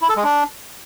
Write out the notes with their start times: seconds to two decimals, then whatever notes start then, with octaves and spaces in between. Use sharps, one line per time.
0.02 E4
0.09 A4
0.17 G#3
0.24 D4